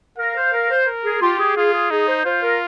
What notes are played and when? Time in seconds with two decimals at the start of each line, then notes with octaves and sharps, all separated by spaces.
0.18 A#4 F5
0.35 C5
0.52 A#4
0.70 C5
0.87 A#4
1.05 G#4
1.21 F4 G4
1.39 G#4
1.56 F4 G#4
1.74 G#4
1.91 D#4 G#4
2.08 C5
2.25 F4 C5
2.42 A#4